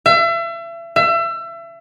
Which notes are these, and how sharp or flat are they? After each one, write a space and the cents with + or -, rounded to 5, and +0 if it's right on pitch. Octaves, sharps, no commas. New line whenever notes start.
E5 +35
E5 +30